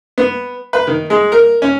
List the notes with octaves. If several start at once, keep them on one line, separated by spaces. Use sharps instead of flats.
B3
B4
D#3
G#3
A#4
C#4